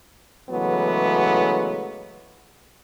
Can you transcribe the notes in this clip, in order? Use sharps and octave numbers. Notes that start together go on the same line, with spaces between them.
C#3 E3 F#3 G#3 A3 B3